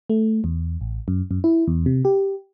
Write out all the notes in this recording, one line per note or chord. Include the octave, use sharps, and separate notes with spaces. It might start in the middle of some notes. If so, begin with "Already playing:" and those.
A3
E2
A1
F#2
F#2
E4
E2
C3
G4